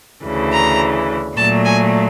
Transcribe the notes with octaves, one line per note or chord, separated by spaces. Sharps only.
D2 C#3 E3
A#5
A#2 F#3 A3 A5
G#5